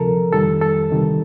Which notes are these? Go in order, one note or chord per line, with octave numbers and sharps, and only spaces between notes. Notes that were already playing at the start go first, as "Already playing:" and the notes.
Already playing: D2 C3 F3 A4 A#4
F2 D#3 G3 A4
A4
D2 C3 D#3 G3